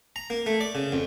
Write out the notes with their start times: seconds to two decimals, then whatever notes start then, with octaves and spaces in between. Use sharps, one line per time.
0.16 A#5
0.30 A#3
0.46 A3
0.61 D5
0.75 C#3
0.92 F2